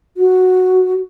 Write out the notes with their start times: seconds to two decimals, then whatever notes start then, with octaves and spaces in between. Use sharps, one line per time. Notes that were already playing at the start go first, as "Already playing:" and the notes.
0.17 F#4